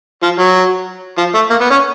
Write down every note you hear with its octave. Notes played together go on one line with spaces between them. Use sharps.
F3
F#3
F3
A3
A#3
B3
C#4